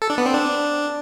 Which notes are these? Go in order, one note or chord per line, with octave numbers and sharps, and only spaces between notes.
A4
D4
B3
C4
D4